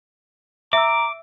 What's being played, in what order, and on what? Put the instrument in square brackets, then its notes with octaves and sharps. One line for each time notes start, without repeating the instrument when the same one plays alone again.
[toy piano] E5 E6 [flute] A#5 [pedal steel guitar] D6